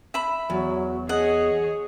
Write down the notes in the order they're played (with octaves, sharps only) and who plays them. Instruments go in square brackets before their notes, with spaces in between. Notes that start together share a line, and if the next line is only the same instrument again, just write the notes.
[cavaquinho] E5 B5
[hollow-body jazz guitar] E2 [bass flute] F#3
[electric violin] G#4 C#5 [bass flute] D#5 [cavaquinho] F#5